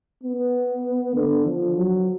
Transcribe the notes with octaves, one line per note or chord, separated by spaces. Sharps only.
B3
D3
F3
F#3